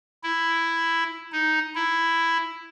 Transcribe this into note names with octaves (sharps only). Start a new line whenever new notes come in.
E4
D#4
E4